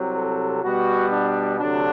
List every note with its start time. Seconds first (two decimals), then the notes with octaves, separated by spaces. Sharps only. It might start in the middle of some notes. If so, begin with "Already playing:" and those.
Already playing: C2 C3 F#3 C4
0.16 A4
0.63 B2 G3 B3 F#4
1.11 D4
1.59 D2 C3 F#3 D4